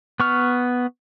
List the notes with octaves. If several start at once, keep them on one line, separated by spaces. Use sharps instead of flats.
B3 C#6 F6